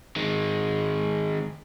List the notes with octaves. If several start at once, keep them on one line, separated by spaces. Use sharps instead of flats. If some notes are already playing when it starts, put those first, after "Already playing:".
D#3 G#3